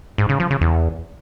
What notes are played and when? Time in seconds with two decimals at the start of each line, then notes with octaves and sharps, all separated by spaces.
0.18 G#2
0.29 C#3
0.40 F3
0.50 C#3
0.61 E2